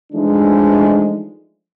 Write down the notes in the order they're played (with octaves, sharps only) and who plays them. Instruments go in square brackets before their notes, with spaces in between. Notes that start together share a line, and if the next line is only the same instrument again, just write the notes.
[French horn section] E3 F3 G#3 A3 D4 D#4